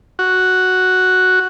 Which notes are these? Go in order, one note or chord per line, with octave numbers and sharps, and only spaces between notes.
F#4